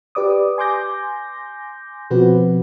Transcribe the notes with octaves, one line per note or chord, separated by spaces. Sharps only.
G4 B4 D5 D6 D#6
G#5 C6 D6 G6 A#6
B2 F3 C4 F#4 B4